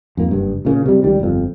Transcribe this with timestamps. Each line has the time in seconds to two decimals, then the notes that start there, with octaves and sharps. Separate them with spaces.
0.17 F2 G#2 A#3
0.31 F#1 G2
0.65 A#2 C#3 A#3
0.86 C3 G3
1.03 C#2 D#3 G3
1.20 G1 F2